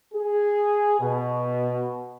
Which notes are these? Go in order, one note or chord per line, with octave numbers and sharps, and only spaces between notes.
G#4
B2